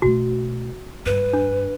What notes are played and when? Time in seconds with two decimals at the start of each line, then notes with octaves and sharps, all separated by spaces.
0.02 B2 A3 F#4
1.06 G2 G3 B4
1.33 D4